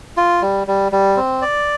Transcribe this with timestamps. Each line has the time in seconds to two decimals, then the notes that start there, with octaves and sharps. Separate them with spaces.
0.17 F4
0.42 G3
0.67 G3
0.92 G3
1.17 C4
1.42 D5